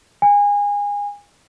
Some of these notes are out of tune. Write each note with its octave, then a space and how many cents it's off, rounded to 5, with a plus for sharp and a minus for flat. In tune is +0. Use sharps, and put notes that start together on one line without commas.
G#5 -25